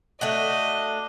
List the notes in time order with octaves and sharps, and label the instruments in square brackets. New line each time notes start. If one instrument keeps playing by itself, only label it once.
[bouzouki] A3 D4 F#4 [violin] D#5